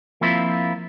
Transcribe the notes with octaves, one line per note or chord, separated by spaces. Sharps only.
F3 A#3 C4 E4 F4